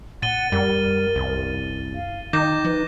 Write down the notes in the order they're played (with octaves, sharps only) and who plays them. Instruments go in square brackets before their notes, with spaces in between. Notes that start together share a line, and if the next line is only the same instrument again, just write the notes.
[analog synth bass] A#2 [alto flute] F#5 [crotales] A6 D#7 G7
[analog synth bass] F#2 [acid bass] G3 [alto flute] A#4
[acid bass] C2
[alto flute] F5
[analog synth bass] D#3 [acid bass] D#4 [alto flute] G5 [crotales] D6 G6 A#6
[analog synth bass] F3 [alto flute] B4